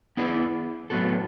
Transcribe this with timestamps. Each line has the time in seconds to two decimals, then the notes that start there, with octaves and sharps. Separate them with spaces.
0.17 B3 E4 G#4 D5
0.90 A2 F#3 B3 F#4 A4